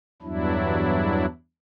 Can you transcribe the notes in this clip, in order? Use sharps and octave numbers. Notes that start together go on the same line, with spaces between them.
E2 G2 F#3 D4 E4